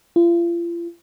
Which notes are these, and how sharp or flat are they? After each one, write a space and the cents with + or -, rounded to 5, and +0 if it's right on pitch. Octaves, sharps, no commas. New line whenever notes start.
F4 -40